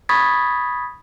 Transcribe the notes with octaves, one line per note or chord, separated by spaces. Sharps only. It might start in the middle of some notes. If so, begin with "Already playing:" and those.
B5 C#6 D#6 G#6 A6 B6